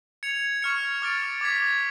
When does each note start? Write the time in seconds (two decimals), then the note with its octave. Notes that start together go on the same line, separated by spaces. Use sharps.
0.23 G#6 C#7 F7
0.62 C#6 F6 G#6 C#7
1.02 D6 F6 A6 D7
1.41 D6 G#6 B6